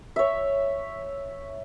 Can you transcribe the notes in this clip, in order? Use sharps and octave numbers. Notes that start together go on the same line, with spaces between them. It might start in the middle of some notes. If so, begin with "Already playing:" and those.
C#5 E5